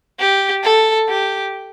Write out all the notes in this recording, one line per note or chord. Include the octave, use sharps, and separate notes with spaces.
G4
A4
G4